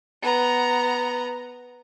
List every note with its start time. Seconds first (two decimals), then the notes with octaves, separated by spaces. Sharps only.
0.22 B3 A#5